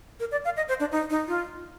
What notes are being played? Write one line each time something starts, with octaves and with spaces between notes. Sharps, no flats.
A#4
D5
F5
D#5
C5
D4
D#4
D#4
F4